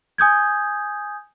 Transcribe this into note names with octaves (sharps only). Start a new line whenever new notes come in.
G#5 D#6 G6 G#6